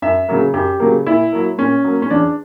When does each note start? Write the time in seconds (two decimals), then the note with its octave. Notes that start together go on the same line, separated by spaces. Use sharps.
0.02 F#2 E5
0.28 C#3 F#3 A#3
0.54 F#2 G4
0.80 C#3 F#3 A#3
1.06 A#2 E4
1.33 F#3 A#3
1.58 A#2 C#4
1.84 F#3 A#3
2.02 C#4
2.10 E2 D4